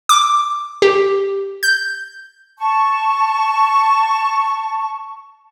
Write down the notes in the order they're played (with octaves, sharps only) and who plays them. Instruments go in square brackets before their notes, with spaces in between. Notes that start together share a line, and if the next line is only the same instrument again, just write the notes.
[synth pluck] D6
G4
G6
[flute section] A5 C#6